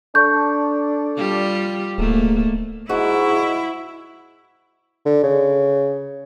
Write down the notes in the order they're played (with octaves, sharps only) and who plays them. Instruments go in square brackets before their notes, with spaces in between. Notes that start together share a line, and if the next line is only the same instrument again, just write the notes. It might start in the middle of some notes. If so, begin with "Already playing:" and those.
[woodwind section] D4 A4 [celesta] C#6 G6
[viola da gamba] G3 F4 G4
[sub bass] D1 [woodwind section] G#2 [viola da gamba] A3 A#3
[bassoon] G#2 [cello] E4 [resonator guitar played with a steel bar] F#4
[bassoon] D3
C#3